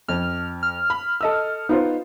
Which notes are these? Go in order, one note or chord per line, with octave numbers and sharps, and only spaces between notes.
F2 F6
F6
B5
A4 D#5 E6
B3 D#4 F4 C5